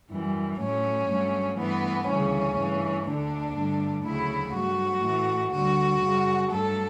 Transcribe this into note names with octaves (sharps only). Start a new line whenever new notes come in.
F#2 E3 G3
A2 F#3 A3 C#4
G2 F#3 A3
G2 E3 A3 B3
D2 C#3 E3 G3 C#4
G2 E3 A3
D2 D3 A3 D4
G2 D3 A3
D2 C#3 F#3 A3 E4
G2 F#3 A3 F#4
A2 E3 A3
D2 D3 G3 F#4
F#2 C#3 G3
G2 F#3 A3 A4